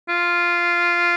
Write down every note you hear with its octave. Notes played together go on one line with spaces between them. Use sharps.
F4